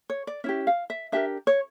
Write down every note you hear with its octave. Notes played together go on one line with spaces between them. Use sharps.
C#5
D5
C#4 E4 G4 E5
F5
E5
D4 G4 A#4 E5
C#5